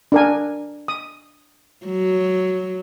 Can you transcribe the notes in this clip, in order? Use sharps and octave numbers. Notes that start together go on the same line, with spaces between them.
D4 A#4 G#5
D#6
F#3